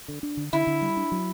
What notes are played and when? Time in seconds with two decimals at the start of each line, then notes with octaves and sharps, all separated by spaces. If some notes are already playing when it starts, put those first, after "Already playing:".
0.08 D3
0.23 D4
0.37 D3
0.53 D3 E4
0.67 D3
0.82 G3
0.97 D4
1.12 F#3